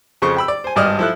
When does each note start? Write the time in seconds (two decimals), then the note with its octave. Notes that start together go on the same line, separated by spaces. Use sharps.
0.22 F2 C#3 C5 C#6
0.37 G5 B5 E6
0.48 D5
0.64 C5 G#5
0.76 G#1 G2 D5 D#5 F6
0.99 F3 E4 A4 F#6